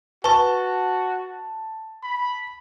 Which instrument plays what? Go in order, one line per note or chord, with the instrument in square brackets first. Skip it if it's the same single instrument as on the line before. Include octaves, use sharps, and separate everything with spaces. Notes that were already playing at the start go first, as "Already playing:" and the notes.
[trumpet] F#4 [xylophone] B4 C#6 [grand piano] A5
[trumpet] B5